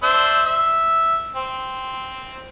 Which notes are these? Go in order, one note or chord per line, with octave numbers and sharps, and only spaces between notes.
D4 C5 E5
E5
C4